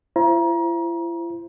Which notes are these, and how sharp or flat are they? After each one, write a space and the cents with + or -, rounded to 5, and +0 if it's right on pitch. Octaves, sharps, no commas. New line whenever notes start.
E4 +45 C5 +0 A#5 +30